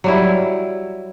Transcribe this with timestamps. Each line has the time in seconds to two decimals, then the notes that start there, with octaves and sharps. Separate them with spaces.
0.04 F#3 G3 E4